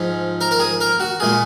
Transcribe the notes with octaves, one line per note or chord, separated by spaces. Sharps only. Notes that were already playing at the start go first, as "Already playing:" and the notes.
Already playing: G#2 F3 G#3
A#4
A#4
G#4
A#4
F#4
A#2 G#3 G#4